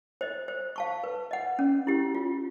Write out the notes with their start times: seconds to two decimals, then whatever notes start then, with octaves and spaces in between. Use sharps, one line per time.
0.21 C5 D#5
0.48 C5
0.76 F5 A5 C#6
1.04 B4
1.31 D#5 F#5
1.59 C#4
1.87 E4 G4
2.15 F4